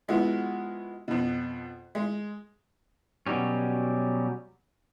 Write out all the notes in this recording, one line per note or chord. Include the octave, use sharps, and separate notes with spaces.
F3 G#3 B3 E4 F#4
F2 B2
G#3
B2 F#3 G3 C#4